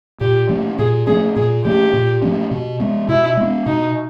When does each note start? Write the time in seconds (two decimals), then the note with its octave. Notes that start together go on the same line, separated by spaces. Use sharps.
0.21 A#2 G4
0.49 F3 A3 C#4
0.79 A#2 G#4
1.07 F3 A3 C#4 G#4
1.35 A#2 G#4
1.65 F3 A3 C#4 G4
1.93 A#2
2.22 F3 A3 C#4
2.51 B2
2.80 G#3 B3
3.08 B2 E4
3.37 G#3 B3
3.66 B2 D#4